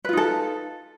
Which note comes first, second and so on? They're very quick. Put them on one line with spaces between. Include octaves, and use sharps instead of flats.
B4 F4 D#4 A4